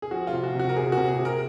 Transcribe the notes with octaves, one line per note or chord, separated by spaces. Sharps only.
G#4
F3 F#4
F4
C3
F#4
C3 F#4
A#4
C3 G#4
F#4
C3
G#4
C3
A#4